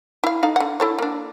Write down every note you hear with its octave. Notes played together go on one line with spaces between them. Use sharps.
E4 F5
D#4 A4 F5
D3 F#5
E4 A4 C#5
A#3 D4